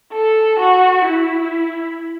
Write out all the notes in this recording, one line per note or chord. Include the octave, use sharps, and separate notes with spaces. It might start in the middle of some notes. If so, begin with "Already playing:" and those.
A4
F#4
E4